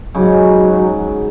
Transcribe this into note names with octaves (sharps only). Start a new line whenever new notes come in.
G#2 C#3 F#3